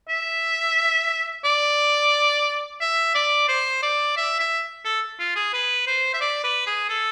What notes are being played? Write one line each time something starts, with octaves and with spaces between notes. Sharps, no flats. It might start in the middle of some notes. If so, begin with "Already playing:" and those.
E5
D5
E5
D5
C5
D5
E5
E5
A4
F4
G#4
B4
C5
E5
D5
B4
G#4
A4